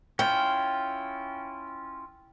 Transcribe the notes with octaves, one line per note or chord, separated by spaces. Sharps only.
C#4 E4 F4 G5